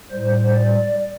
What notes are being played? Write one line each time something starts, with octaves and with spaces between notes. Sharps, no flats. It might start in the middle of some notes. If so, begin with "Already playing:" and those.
A2 G3 C5
D5